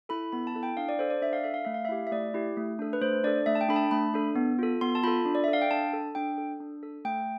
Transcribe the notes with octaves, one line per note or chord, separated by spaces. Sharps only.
E4 A4 B5
B3 B5
A5
E4 A4
G5
D4 F5
D5
A4 C5
D5
D4 E5
F5
A4 E5
F5
A3 E5
F5
E5
E4 G4
E5
A3 D5
E4 G4
A3
D4 A4
B4
A3 C5
D4 A4 D5
A3 E5
A5
G5
D4 A4 B5
A5
A3 B5
D4 A4
B3
F4 A4
B3 C6
A5
F4 A4 B5
D4
D5
E5
A4
F5
G5
D4 A5
A4
D4 G5
A4
D4
A4
A3 G5